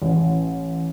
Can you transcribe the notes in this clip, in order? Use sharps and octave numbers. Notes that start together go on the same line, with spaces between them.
A1